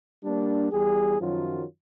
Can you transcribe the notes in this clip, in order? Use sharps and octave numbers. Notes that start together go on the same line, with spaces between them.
G3 A#3 D4
E2 G3 G4 G#4
F#2 D#3 F3 F#3 F4